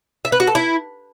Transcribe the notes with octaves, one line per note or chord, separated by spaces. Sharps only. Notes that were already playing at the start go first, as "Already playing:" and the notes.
E5
B4
F#4
A4
E4